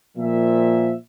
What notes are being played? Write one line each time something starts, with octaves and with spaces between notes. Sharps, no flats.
A#2 F3 E5